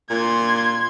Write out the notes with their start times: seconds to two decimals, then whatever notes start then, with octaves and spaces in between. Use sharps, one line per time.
0.10 A#2 C6 G#6